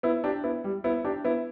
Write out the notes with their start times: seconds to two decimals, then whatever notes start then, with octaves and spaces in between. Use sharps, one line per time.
0.03 B3 E4
0.24 D4 G4
0.44 B3 E4
0.64 G3
0.84 B3 E4
1.04 D4 G4
1.24 B3 E4